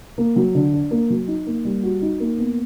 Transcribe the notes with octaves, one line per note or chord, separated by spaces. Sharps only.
A#3
F#3
D3
D4
A#3
F#3
D#4
A#3
G3
F#4
D#4
A#3
B3